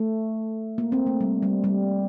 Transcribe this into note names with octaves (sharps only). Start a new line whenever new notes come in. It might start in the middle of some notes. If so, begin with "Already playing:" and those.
Already playing: A3
A#3
C4
A3
G3
G3
G3